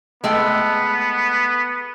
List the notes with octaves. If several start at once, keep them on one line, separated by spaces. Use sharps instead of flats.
G#3 A3 B3 G5